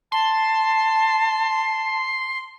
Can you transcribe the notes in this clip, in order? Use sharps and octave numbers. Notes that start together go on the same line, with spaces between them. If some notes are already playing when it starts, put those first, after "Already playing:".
A5 C6